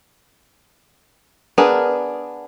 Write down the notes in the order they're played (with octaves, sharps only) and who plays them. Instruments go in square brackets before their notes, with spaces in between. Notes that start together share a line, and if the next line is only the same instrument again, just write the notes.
[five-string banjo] B3 D4 G#4 A#4